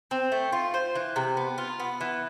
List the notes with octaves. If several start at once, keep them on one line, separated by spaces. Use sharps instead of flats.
C4
A3
F4
C5
E3
C3
B3
F4
B3
E3